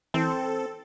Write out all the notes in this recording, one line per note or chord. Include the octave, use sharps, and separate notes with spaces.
E3 C4 A4